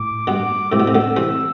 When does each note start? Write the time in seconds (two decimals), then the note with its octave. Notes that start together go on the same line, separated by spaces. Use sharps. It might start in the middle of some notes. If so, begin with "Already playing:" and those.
Already playing: A2 D6
0.27 G2 B2
0.72 A2 C3 E6
0.80 B2
0.87 C3
0.95 B2 D3
1.16 C3 E3